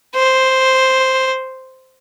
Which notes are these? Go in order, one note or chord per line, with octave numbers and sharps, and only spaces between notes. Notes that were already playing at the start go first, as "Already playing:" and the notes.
C5